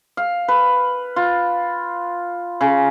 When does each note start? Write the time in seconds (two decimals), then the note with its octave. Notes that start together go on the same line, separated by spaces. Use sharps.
0.17 F5
0.48 B4
1.16 F4
2.61 C#3